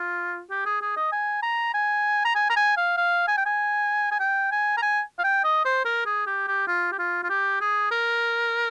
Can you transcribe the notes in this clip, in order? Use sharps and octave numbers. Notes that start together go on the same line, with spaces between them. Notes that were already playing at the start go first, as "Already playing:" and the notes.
Already playing: F4
G4
G#4
G#4
D#5
G#5
A#5
G#5
A#5
G#5
A#5
G#5
F5
F5
G#5
G5
G#5
G#5
G5
G#5
A#5
G#5
F5
G5
D#5
C5
A#4
G#4
G4
G4
F4
G4
F4
F4
G4
G#4
A#4